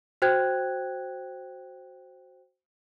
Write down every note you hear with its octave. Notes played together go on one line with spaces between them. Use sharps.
F#4 C5 G5 F#6 G#6